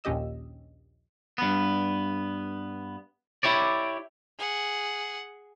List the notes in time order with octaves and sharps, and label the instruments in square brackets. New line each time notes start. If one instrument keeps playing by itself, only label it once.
[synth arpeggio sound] A#1 D#2 C#4 G4 D#5 E6
[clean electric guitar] G2 B3
E4 G4 C#5 D5
[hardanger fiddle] G#4 F#5